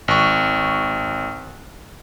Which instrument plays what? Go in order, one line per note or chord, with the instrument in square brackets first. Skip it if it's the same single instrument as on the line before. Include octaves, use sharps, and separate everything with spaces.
[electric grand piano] G#1 C#6